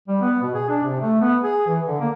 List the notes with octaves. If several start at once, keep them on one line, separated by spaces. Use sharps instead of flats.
G3
B3
B2
G#4
D4
C3
A3
B3
G#4
E3
D3
A#3